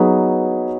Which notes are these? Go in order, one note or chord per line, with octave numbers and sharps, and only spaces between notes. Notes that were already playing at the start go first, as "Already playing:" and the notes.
Already playing: F#3 B3 D#4 G#4 B4